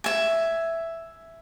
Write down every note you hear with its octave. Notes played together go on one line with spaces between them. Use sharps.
E5 G#5